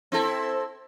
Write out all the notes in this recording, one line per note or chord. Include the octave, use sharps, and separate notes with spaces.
C4 E4 A4